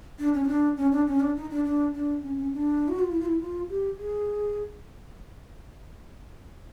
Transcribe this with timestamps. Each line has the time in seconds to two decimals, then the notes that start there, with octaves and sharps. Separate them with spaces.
0.19 D4
0.33 C#4
0.44 D#4
0.48 D4
0.77 C#4
0.92 D4
1.07 C#4
1.20 D4
1.36 D#4
1.50 D4
1.65 D4
1.94 D4
2.22 C#4
2.37 C#4
2.52 D4
2.88 F#4
2.99 F4
3.10 E4
3.20 F4
3.25 E4
3.39 F4
3.69 G4
3.97 G#4